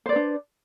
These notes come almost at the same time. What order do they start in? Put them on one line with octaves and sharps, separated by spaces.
C5 D5 B4 D4